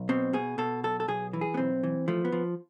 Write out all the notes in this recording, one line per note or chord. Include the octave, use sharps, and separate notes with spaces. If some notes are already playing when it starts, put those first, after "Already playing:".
Already playing: B1
B2 C4
B2 G#4
B2 A4
B1 A4
A4
B1 G#4
E3
G#4
B3
B1 C4
E3
F3 A3
B3
F3